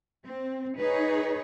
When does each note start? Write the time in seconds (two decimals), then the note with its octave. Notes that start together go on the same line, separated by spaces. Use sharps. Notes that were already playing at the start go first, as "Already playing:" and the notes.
0.25 C4
0.77 D#4 G#4 B4 C#5